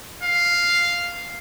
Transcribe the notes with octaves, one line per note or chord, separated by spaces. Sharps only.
F5